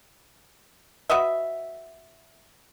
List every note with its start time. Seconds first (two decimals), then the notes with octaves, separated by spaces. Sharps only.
1.10 F#4 B4 D#5 E5